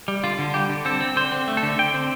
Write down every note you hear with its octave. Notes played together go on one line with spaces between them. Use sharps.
G3
D3 F4
D3
G3 G4
D3
C4 A4
C4
D3 C5
C4
A3
A4
D3
D3 G5
C4